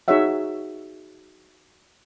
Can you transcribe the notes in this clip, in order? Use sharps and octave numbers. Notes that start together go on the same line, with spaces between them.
D#4 F#4 G#4 C#5 E5 F#5